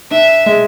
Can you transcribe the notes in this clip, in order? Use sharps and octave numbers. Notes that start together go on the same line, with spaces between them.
D4 E5
G#3